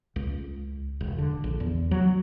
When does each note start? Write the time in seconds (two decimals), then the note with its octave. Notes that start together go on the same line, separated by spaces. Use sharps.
0.16 C#2
1.01 E1
1.18 D3
1.44 A#1
1.60 E2
1.91 F#3